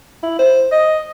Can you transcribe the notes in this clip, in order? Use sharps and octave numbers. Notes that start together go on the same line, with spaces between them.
E4
C5
D#5